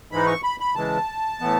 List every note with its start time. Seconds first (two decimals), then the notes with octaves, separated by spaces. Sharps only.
0.11 G#2 E3 G#3 D#4 B5
0.27 C#6
0.43 B5
0.60 B5
0.75 C#3 E3 G#3 A5
1.40 A2 E3 B3